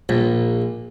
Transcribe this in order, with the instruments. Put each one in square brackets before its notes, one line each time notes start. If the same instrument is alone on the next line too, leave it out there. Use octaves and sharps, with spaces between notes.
[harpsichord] A#1 [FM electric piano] A#2